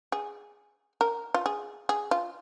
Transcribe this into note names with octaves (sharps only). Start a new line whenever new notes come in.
G#4
A#4
F4
G#4
G#4
F4